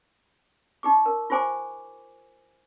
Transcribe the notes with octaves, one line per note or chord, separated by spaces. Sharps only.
D#4 G4 D6
A#4
F4 G4 C5 G#5 D6